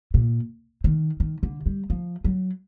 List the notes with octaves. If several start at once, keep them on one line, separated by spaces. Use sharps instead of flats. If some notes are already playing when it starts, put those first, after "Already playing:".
A#2
D#3
D#3
D3
G3
F3
F#3